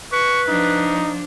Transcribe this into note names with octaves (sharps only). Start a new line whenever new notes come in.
B4 C#6
F3 D4 D#4